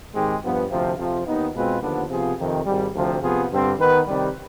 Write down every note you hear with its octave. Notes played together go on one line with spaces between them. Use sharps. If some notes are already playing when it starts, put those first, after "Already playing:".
G#2 D#3 G#3 C4 G4
G2 F3 B3
D2 C3 F3
F2 C3 F3
D#2 D#3 B3 D#4
B2 G#3 C4 F4 B4
D#2 D3 F3 B3 D4
C3 F3 B3 F4 G#4
F2 C3 D#3
G#1 G#2 G3
D2 C3 F3
C3 F3 B3 F4 G#4
G2 D3 G3 C4
D#3 B3 D#4 B4
C3 D#3 G3